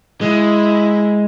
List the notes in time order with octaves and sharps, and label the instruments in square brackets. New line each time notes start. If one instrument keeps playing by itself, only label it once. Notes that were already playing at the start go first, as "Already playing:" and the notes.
[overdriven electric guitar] G#3 [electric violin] E4